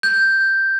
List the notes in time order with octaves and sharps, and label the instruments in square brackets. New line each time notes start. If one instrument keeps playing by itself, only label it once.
[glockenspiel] G6